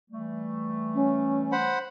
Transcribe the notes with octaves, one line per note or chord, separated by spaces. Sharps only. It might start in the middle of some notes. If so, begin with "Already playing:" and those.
E3 G3 A3
C#4
C5 F#5 B5